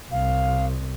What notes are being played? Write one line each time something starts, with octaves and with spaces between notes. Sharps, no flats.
C2 F5